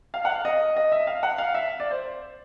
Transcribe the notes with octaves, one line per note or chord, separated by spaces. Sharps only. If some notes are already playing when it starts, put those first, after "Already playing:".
F5
F#5
F5
D#5
D#5
E5
F5
F#5
F5
E5
D5
C5